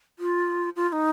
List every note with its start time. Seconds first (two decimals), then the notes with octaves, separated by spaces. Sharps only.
0.19 F4
0.76 F4
0.89 F4
0.92 D#4